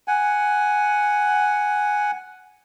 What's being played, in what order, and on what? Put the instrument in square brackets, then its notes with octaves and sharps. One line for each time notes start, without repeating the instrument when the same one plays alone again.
[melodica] F#5 G#5